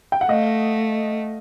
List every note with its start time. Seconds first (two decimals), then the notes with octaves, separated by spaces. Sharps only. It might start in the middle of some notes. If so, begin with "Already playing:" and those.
0.12 G5
0.21 F#5
0.29 A3 D#5 F5